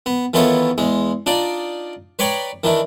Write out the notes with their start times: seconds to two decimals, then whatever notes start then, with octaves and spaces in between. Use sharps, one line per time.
0.06 B3
0.34 D#3 E3 B3 F4 A4 C#5
0.78 E2 G#3
1.26 D4 D#4 F4 D5
2.19 B4 C#5 D5 G5 A#5 B5
2.64 D#3 E3 D4